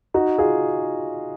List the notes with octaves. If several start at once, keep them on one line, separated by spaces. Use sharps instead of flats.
D#4 F#4
F4 G#4